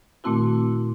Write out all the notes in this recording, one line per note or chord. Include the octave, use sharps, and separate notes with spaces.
A#2 D#3 A3 C4 E4 F#4